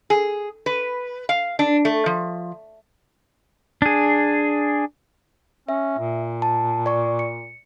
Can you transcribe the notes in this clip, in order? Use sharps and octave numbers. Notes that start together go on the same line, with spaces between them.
G#4
B4
F5
D4
A3
F3
D4 G#4
C#4 E5
A#2
A5
D5 C#6
C#7